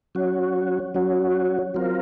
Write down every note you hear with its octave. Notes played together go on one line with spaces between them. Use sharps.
F#3 C#4 F#4
F#3 C#4 F#4
F#3 C4 F4 A#4